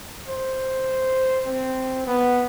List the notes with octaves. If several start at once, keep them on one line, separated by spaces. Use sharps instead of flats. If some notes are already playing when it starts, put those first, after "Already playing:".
C5
C4
B3